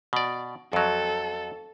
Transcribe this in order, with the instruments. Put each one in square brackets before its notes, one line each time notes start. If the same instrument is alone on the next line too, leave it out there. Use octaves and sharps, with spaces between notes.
[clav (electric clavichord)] B2 D5
[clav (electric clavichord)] F2 F#3 [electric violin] A4